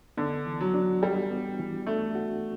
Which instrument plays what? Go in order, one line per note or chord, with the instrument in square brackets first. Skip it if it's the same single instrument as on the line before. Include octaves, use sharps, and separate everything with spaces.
[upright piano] D3 [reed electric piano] B3
[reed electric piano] E3
[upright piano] F#3
[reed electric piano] D4
[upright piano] G3 [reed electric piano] F#4
[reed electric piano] B3
E3
[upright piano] A3 [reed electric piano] D4
[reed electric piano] F#4